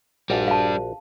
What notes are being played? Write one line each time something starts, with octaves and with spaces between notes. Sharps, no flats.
A#1 G3 D4 F#4 G#5
F5 A5